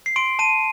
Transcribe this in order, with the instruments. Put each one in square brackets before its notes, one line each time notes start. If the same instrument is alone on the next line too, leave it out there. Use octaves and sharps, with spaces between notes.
[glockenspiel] C7
C6 D7
A5 D#7